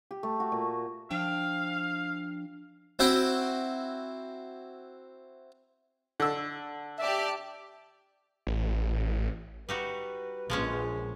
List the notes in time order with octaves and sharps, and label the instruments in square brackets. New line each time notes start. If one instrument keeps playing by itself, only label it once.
[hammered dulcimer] G4
A3
F#4
A#2
[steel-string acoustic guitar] F3 D4 G5 [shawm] F5
[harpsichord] C4 E4 F#4 F#5 G5 B5
[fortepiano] D3 E6
[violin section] G4 D5 A5 [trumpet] E5
[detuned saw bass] A1
[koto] G3 D#4 F#4 [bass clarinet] B4
[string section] A#1 [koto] F3 G#3 C#4